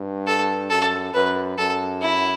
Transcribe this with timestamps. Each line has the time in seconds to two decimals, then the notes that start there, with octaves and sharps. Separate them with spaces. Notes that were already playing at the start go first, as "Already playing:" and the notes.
Already playing: G2
0.27 A4
0.70 F#2 A4
1.14 F#2 B4
1.58 F#2 A4
2.01 E4